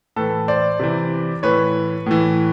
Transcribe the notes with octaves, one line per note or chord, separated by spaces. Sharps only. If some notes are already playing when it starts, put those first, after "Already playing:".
A2 E3 A4 B4
C5 D5
C3 E3
A2 E3 B4 C#5
A2 E3